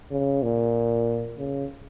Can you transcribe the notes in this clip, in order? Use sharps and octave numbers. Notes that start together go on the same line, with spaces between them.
C#3
A#2
C#3